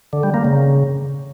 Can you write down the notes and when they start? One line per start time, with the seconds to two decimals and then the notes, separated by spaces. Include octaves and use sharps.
0.13 D3
0.23 G3
0.34 A#3
0.44 C#3